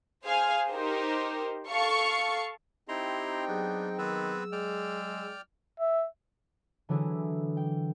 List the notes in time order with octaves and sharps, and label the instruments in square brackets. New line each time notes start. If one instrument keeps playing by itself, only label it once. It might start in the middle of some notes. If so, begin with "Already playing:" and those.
[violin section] G#4 C5 F5 G#5 F6
D#4 G4 A#4 C5
A4 F5 C#6 C#7
[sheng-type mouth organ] C4 D#4 G5 [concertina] E4 A#5 C6 [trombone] G4
[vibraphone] F#3 G#4 [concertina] B3 D4
[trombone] D#3 [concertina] B3 C4 B4 [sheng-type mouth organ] E6
[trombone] G#3 [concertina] D5 G5 F6
[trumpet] E5
[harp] D3 E3 F#3 D4 E4 G#4
G5